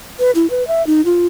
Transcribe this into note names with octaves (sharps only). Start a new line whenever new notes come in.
B4
E4
B4
E5
D#4
F4